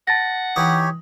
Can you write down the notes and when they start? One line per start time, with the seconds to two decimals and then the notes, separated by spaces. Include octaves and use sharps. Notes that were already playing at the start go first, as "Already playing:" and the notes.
0.07 F#5 A5 A6 A#6
0.56 E3 D#4 G4 C#5 G5 D#6